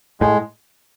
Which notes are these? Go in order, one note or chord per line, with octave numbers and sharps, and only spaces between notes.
A2 G#3